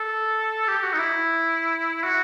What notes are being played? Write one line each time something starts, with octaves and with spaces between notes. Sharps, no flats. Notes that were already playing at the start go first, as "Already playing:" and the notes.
Already playing: A4
G4
F#4
D#4
E4
F#4